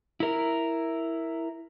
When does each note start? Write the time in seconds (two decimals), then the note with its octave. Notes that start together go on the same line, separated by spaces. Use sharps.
0.20 E4 A#4